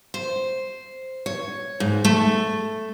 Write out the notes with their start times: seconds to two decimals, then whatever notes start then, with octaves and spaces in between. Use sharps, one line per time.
0.14 C5
1.26 C#5
1.80 G#2
2.05 A3